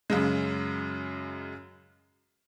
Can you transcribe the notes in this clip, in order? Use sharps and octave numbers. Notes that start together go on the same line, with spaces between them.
F#2 C#3 G#3